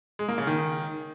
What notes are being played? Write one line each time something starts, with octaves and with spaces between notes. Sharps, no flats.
G#3
A#3
C#3
D#3